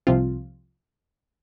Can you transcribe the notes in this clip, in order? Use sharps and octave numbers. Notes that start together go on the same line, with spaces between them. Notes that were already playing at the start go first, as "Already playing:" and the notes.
C2 C3 F3 C4 F4